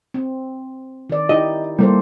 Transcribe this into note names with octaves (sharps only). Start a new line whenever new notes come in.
C4
D#3 D5
D#4 E4 G4 D#5
G3 A#3 E4 A4 C5